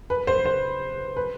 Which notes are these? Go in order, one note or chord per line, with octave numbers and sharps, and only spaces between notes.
B4
C5
C5
B4